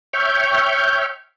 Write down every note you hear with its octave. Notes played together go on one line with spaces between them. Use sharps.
C#5 E5 G5 C#6 F6 G6